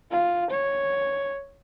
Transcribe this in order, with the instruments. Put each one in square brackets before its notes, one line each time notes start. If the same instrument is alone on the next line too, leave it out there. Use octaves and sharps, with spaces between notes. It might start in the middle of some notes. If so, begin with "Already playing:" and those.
[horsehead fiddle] F4
C#5